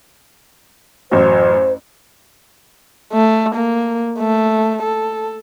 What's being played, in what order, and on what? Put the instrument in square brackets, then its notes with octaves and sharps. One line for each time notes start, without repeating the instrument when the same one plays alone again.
[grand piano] A1 F#2 [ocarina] C5
[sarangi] A3
A#3
A3
A4